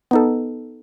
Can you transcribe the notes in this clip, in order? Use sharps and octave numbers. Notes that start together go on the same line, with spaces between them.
B3 D#4 A4